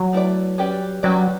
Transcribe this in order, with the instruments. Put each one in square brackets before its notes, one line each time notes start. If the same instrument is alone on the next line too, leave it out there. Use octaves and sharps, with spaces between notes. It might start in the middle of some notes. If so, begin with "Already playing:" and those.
Already playing: [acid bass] F#3
[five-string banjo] A3 E4 B4 D5
G3 C#4 G4 B4 D5
[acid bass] F#3 [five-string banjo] G3 C#4 G4 B4 D5